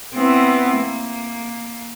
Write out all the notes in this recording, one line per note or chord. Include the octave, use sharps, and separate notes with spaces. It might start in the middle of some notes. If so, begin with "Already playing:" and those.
B3 C4 E4
A#3